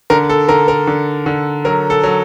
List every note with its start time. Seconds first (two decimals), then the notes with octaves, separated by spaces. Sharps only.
0.10 D3 A#4
0.29 A4
0.49 D3 A#4
0.68 A#4
0.87 D3
1.26 D3
1.65 F#3 A#4
1.90 A4
2.03 F#3